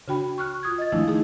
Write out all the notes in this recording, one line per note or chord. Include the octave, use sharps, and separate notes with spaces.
C#3 D4 F#4 G5 B5
C#6 F6 F#6
F4 D#6 G#6
D#5 A6
D#3 F3 G#3 A3 D4 E4
D#4 G#4